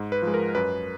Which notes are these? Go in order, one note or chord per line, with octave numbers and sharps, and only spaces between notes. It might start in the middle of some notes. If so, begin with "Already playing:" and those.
Already playing: G#2
B4
F3 G#3
A#4
F#2 B4